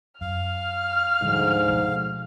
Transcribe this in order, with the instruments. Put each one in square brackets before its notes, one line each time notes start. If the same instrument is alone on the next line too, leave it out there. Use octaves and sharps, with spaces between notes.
[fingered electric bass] F#2 [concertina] F5 [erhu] F6
[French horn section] D2 G#2 [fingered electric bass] D3 F3 G3
[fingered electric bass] B2 F3